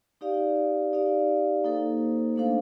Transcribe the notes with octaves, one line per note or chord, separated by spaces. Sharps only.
D#4 G4 D5 F5
D#4 G4 D5 F5
A#3 D#4 A4 C5
A3 D4 A4 C5 F5